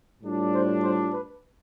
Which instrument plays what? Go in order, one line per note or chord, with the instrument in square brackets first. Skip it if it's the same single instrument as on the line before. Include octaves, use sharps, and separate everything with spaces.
[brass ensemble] A2 G3 D4 F4
C5
C5
B4